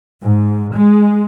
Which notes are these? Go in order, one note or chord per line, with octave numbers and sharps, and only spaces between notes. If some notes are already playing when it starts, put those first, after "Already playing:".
G#2
G#3